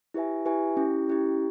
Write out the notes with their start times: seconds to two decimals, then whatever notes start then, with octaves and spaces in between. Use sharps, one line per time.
0.14 E4 G4 B4 E5 G#5
0.46 E4 G4 B4 E5 G#5
0.77 C#4 E4 G4
1.09 C#4 E4 G4